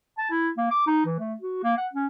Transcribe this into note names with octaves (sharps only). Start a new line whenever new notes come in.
A5
E4
A#3
D6
D#4
E3
A3
F#4
A#3
F#5
C#4